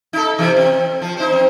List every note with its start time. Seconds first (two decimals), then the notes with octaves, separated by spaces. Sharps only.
0.13 D#4 A4
0.38 C3 E3
0.57 C4
1.02 F3
1.17 D#4 C5
1.32 C4